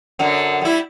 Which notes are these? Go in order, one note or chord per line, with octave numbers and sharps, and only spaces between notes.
F#2 D3 F#3
G3 E4